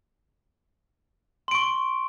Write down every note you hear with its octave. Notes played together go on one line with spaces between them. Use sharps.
C6 C#6 D7